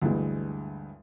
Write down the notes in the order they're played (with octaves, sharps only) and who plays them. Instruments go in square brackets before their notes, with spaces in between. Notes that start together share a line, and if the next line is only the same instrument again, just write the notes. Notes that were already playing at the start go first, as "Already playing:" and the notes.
[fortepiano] D2 G2 E3 G#3